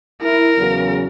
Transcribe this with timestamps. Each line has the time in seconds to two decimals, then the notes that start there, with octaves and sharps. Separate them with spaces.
0.22 E4 A#4
0.58 E2 C#3 F#3